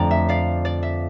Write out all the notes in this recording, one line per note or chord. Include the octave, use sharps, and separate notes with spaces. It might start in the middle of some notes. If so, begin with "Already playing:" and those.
Already playing: F2 D3 A3 D5 G5 A#5
E5
D5 F5
D5
E5